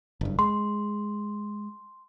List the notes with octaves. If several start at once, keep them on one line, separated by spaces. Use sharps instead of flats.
F#1 G2
G#3 C6